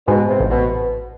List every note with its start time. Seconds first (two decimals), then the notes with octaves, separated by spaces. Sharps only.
0.08 G#2 B2
0.29 C3
0.40 A1
0.50 B2